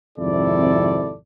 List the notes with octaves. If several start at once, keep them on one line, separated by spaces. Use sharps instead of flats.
G#1 F2 C3 E4 A4 D5